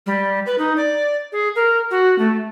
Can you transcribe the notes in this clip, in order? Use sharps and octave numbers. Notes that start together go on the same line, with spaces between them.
G3
B4
D#4
D5
G#4
A#4
F#4
A3